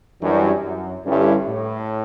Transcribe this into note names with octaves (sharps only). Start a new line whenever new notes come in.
F#2 E3 G3 D4
F#2
G2 D3 G3 C#4 E4
A2